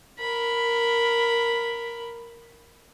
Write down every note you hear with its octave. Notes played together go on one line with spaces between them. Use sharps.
A#4 B5